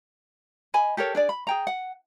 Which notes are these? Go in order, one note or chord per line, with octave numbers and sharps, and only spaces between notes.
D#5 G#5 B5
G4 A4 A#4 C#5
D4 G#4 D5
B5
G#4 G5 A#5
F#5